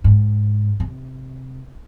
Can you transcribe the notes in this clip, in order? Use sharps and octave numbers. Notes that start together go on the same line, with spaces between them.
G#2
C3